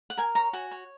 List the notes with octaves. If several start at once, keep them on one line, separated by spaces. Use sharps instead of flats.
F#5
A#4 G#5
C#5 A#5
F#4 G#5
C#5